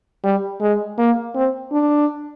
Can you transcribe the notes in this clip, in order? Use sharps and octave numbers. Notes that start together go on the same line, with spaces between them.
G3
G#3
A#3
C4
D4